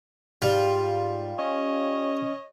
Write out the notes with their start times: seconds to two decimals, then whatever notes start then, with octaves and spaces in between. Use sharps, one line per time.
0.42 G#2 G3 F4
1.39 C#4 C#5 D#5